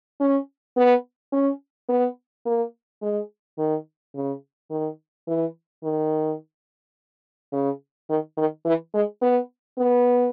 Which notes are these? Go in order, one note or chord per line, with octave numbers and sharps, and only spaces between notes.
C#4
B3
C#4
B3
A#3
G#3
D#3
C#3
D#3
E3
D#3
C#3
D#3
D#3
E3
G#3
B3
B3